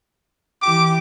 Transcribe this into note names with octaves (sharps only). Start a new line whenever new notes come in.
E3 G4 D6